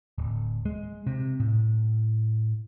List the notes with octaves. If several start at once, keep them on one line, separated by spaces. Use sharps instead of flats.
D1
G#3
C3
A2